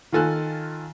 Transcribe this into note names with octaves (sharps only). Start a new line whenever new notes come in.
D#3 F4 A4 G#5 F#6